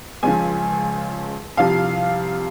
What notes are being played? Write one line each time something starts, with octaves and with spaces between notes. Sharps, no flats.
C#2 C#3 F3 G#5
C2 C3 F3 F5